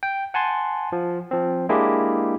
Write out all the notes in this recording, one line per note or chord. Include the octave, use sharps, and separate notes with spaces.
G5
F#5 G#5 A5 C6
F3
F3 C4
G#3 A#3 D4 E4 G4 G#4